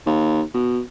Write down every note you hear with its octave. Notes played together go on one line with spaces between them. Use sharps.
D#2
B2